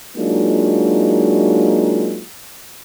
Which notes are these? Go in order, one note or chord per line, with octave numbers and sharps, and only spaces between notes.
F#3 G#3 A#3 D4 D#4 F4